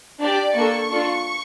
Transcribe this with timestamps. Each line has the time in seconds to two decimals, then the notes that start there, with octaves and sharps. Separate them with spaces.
0.20 D4 G4 D5
0.55 A#3 D4 A4 C#6
0.90 D4 F4 A4